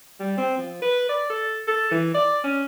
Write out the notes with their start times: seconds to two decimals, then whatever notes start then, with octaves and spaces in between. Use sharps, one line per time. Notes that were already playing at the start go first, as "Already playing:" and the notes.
0.20 G3
0.37 C4
0.58 F3
0.82 B4
1.09 D5
1.30 A4
1.68 A4
1.91 E3
2.14 D5
2.44 C#4